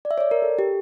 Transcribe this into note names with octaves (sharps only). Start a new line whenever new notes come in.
D5
E5
C#5
D5
A#4
A4
G4